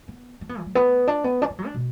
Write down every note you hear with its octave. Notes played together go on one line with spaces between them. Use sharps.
B3
D4
B3
E3
F#3
B3
D4
B3
D4
B3
F#3
D4
B2